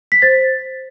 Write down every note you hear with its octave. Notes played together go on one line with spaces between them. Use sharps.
B6
C5 A6